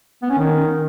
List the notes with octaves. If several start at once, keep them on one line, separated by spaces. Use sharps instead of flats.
B3
C#4
D#3